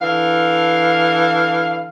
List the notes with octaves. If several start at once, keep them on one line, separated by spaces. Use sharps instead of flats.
D3 E3 F5